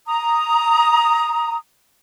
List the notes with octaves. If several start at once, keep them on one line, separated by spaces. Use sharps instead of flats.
A#5 D#6